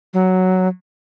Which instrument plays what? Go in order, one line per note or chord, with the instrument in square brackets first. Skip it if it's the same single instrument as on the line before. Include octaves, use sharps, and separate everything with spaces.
[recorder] F#3